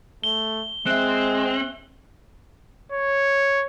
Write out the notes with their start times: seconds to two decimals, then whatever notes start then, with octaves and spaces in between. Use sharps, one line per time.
0.24 A3 G7
0.86 G#3 C4 E5 F#6
2.92 C#5